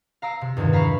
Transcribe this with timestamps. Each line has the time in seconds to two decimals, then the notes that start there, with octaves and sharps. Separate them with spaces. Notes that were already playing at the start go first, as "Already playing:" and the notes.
0.22 F5 A#5 E6 D7
0.41 C3
0.57 E2 G2 C3 D#3 F3
0.73 E5 F5 A#5 B5 C#6 F6